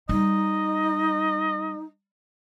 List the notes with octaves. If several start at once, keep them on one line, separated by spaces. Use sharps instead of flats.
G3 D#4 D#5